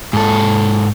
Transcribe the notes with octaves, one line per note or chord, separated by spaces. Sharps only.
G#2 A4